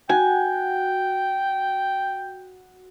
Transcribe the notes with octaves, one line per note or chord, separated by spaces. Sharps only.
F#4 G5 G#5